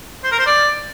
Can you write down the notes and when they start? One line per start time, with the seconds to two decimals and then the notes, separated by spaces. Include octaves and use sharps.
0.24 C5
0.31 A#4
0.39 C5
0.46 D5